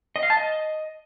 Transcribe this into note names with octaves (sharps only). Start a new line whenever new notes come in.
D#5
F5
A5
D#5